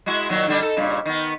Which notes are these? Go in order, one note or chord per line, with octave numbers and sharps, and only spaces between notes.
G#3 E4 F#4
A#2 D#3 F#3
D3 G3 D4
D#4 A4
G2 A#2 C#3
D#3 B3